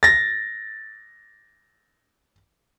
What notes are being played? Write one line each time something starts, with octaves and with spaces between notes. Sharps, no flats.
A6 A#6